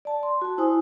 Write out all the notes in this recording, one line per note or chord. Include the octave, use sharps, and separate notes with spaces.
D5 A5
C6
F#4 A5
E4 C5 G#5 D#6